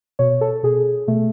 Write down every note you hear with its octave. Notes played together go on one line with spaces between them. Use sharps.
B2 C#5
A4
B2 G#4
B2 A3